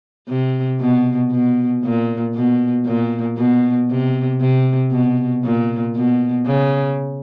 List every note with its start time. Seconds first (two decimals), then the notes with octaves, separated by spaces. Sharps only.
0.28 C3
0.80 B2
1.31 B2
1.84 A#2
2.34 B2
2.86 A#2
3.37 B2
3.90 C3
4.40 C3
4.92 B2
5.44 A#2
5.96 B2
6.46 C#3